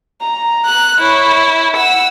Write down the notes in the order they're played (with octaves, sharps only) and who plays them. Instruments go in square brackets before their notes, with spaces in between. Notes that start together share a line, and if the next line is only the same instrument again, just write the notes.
[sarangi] A#5
[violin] F#6
[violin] E4 [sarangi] C#5
[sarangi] F#5 [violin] E6